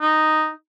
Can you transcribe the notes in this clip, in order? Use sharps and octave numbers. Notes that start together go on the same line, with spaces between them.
D#4